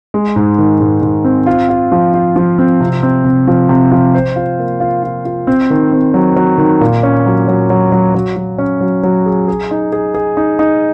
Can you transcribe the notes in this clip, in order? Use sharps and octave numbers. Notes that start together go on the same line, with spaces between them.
G#3
G#2
D#3
G#2
G#2
C4
F4
F4
F3
F4
F3
C4
C3
C4
C3
F3
C3
F3
C5
F4
A#3
F4
F4
F4
C4
D#3
C4
F#3
F#3
D#3
A#2
C#4
F#3
F#3
F#3
F#3
F#3
F#3
C#4
F#3
F#3
G#4
G#4
D#4
G#4
G#4
D#4
D#4